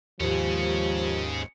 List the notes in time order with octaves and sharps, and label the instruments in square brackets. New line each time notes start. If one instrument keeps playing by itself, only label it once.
[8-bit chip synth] D#2 G#2 [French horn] F3 [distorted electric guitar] C#4 G#4 [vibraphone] G4